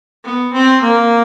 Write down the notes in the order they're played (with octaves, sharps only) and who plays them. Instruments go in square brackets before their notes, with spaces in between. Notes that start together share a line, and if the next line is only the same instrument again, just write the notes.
[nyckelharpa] B3
C4
A#3